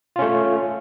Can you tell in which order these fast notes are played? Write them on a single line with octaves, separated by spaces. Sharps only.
F4 C#4 A3